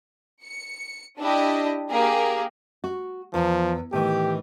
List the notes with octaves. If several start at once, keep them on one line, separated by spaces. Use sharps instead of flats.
C#7
D4 E4 G4 D#5
A#3 G4 G#4 A#4
F#4
E2 F3
A2 D#3 E3 G4